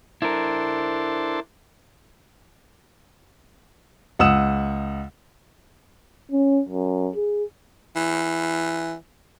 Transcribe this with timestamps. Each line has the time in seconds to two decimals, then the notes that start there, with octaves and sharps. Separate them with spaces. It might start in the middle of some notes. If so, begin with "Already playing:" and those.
0.22 D4 E4 A4 A#4 C5
4.19 C#2 F#5 D#6 E6 E7
6.32 C#4
6.69 F#2
7.16 G#4
7.96 E3